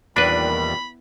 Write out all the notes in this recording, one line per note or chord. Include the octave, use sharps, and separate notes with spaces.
E2 A#2 D#3 G3 D4 B4 B5